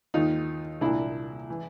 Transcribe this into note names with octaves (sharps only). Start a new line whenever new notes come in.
D#2 D#3 D#4 F4
C2 A#2 D4 E4
E3